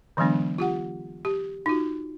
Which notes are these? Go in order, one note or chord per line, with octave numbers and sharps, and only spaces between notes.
D3 E3 F#3 G#3 B3 D4
F4 G4 F#5
G4
D#4 F4 F#4